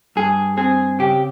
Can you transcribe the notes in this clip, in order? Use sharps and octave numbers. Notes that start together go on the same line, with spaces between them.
G2 G#4
C4 G#4
C#3 G4